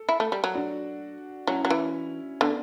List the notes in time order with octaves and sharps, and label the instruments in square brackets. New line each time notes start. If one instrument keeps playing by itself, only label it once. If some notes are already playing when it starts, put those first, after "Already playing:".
Already playing: [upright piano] A4
[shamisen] E4
A3
G3
F#3
[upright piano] D4 F#4
[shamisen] F#3 [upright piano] C#4 E4
[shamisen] F#3
E3
[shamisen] D3 [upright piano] B3 D4